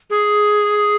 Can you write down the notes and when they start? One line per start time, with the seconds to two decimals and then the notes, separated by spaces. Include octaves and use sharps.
0.10 G#4